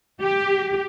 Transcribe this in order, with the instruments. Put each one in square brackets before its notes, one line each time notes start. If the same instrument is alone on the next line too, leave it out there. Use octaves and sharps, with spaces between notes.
[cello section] G4